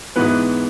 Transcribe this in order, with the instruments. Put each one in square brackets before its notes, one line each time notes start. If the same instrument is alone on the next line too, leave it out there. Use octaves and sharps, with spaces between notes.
[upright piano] G#2 E3 B3 B4